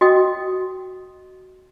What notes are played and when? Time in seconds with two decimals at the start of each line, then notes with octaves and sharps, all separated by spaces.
0.01 F#4 D#5 G5 D#6